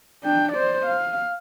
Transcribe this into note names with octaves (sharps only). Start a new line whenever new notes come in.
D4 G5
C5 D5
F5